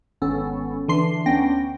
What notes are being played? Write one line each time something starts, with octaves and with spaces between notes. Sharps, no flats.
G#1 B3 C#4 A4
D3 E3 D4 C6 C7
D2 B3 C#4 D4 G5 A#6